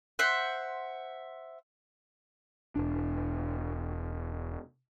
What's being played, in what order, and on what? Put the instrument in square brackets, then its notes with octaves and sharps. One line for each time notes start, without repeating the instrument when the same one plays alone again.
[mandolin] C5 E5 F#5
[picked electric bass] E1 D4